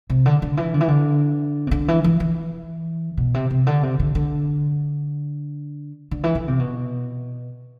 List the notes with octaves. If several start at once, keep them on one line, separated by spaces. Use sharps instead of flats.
C3
D3
D3
E3
D3
E3
D3
C3
D3
E3
E3
E3
B2
C3
C3
D3
C3
D3
D3
D3
E3
D3
C3
B2